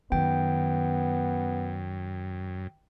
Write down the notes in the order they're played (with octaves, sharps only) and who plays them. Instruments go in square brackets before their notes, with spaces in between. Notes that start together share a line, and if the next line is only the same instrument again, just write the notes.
[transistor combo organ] F#2 [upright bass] D#3 [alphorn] B3 [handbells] G5